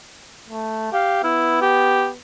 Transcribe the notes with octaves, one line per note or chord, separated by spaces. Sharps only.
A3
G4 F5
B3 E4
G4